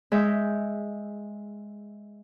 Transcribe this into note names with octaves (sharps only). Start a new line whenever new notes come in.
G#3 E5 G6